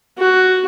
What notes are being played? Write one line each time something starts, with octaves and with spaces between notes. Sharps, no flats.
F#4